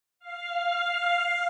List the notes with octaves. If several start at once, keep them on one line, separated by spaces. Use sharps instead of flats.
F5